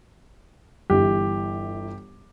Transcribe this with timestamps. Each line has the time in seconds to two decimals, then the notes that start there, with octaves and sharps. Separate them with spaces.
0.90 G1 E3 G4